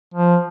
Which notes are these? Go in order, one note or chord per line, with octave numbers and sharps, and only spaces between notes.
F3